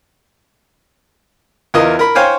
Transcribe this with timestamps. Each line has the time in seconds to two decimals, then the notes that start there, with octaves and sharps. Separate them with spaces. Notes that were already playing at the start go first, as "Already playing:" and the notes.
1.74 E2 E3 F4 A#4 D#5
1.99 A#4 B5
2.15 C5 C#5 F5 G5 G#5